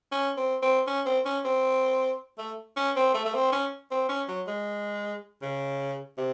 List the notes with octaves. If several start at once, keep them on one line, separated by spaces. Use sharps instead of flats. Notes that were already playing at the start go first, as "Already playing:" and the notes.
C#4
C4
C4
C#4
C4
C#4
C4
A3
C#4
C4
A3
A3
C4
C#4
C4
C#4
F#3
G#3
C#3
C3